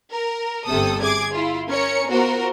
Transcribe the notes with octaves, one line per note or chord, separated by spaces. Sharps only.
A#4
G1 C3 A4 D#6
G#4 D6 G#6
E4 F4
C#4 A#4 C#5 C#7
B3 F4 F#4 A#4 C5